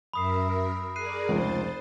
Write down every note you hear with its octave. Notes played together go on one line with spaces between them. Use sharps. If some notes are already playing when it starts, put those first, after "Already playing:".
F#2 A#4 E5 B5 D#6 C7
G#4 A#4 D5 F#6 C7 D#7
F1 C#2 C5 A6